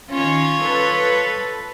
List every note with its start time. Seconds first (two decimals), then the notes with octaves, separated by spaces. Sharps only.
0.10 D#3 C#4 F4 C#5
0.64 A4 B4